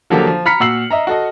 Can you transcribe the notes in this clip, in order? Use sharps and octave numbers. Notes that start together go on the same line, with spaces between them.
D3 F3 F#3 A#3 G4 A4
F3
A#5 B5 F6 B6 C#7
A#2 F#4 E6 C7 F#7
D#5 E5 A#5
F#4 A4 D#5